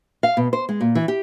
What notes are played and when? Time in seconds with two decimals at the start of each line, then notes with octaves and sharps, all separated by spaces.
0.23 F5
0.37 B2
0.53 C5
0.69 G#3
0.81 A#2
0.95 E3
1.08 G4